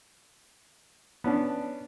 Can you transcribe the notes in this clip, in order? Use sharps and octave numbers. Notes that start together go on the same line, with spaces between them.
B3 C#4 D4